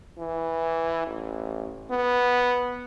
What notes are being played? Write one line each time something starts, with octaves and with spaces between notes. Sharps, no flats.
E3
A1
B3